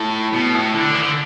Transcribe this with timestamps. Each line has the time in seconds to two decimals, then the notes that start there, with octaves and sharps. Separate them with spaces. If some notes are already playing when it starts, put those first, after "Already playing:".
Already playing: A2
0.33 B2
0.55 A2
0.74 D3
0.95 E3
1.02 D3